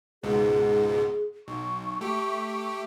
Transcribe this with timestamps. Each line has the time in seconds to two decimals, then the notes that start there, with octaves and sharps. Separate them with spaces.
0.23 C#2 G#2 B2 G#4
1.48 B1 C#6
2.01 A3 G4